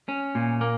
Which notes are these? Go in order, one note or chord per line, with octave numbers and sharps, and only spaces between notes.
C#4
A#2
A#3